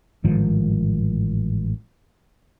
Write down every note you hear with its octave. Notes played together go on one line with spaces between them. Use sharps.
A1 G#2 D#3 F3